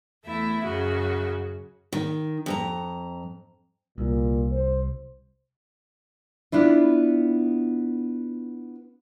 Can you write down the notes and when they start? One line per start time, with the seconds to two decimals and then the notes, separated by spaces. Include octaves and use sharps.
0.24 E2 A3 E4 E5
0.64 F#2 C#3 F#4
1.93 D#3
2.46 F2 A4 A#5
3.98 C2 A#2
4.52 C5
6.52 B3 D4 E4 F4